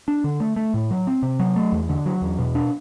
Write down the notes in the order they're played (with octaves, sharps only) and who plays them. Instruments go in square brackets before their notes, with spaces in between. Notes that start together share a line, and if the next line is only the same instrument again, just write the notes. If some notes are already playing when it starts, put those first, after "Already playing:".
[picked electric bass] D4
D3
A3
A3
A2
F#3
C4
C3
F#3
A3
E2
D3
F#3
E2
B2
D4